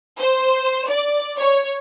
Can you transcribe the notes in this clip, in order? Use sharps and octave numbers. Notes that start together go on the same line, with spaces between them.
C5
D5
C#5